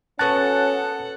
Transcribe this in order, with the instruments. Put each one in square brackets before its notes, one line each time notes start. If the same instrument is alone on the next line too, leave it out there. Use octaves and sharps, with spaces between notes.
[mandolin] B3 F#4 [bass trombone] C#4 [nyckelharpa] A4 F#5 [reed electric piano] A5 F#6 A6